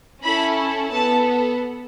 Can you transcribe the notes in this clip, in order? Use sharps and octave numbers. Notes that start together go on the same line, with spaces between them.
C#4 E4 A4 B5
B3 A4 A5